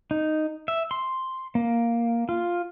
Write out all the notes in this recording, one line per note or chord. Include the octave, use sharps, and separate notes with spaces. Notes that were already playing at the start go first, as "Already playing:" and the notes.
D#4
E5
C6
A#3
F4